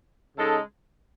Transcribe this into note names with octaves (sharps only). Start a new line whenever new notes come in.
C#3 G#3 D#4 A4